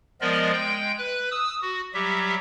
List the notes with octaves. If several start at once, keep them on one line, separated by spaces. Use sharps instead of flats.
F3 G#3 B3 A#4 D5 D#5
G#3 G5 G6
B4 F#6
D#6 E6
F#4
F#3 G3 G4 E5